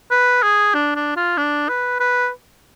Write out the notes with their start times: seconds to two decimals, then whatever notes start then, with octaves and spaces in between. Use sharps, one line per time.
0.11 B4
0.43 G#4
0.74 D4
0.95 D4
1.16 F4
1.37 D4
1.69 B4
2.00 B4